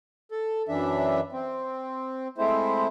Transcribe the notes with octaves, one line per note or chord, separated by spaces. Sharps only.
A4
F#2 E3 D4 E5
C4
G#3 A3 C4 E4 C5